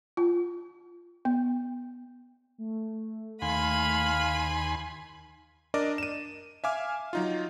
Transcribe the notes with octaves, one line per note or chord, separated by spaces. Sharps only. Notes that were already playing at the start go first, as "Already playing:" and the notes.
F4
B3
A3
D#2 F5 G#5 B5 C6 D#7
D4 A#4 D5 D#5 D6
D#7 E7
E5 F5 G#5 D6 F6
F#3 D#4 F4